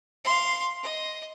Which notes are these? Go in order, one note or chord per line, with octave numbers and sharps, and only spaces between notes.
F5 C6
D#5